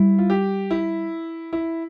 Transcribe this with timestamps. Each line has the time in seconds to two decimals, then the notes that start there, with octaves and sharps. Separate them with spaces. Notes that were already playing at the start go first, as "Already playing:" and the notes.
Already playing: G3 E4
0.18 F4
0.30 G4
0.71 E4
1.53 E4